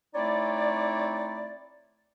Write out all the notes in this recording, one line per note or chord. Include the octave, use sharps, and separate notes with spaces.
A3 C4 D#4 E4 C#5 D5